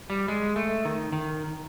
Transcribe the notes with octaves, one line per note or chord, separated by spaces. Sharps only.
G3
G#3
A3
D#3
D#3